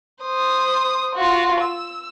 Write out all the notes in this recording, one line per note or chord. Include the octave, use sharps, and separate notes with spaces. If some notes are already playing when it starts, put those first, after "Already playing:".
C5 D#6
F4 F#4
E6